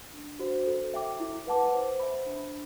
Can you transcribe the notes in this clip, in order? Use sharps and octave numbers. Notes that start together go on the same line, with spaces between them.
D4
F#4 C5
A4
E5 G5 D6
E4
B4 F#5 A5 D6
C5
E5 B5
D4